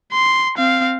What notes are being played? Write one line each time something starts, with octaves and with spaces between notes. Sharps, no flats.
C6
C4 F5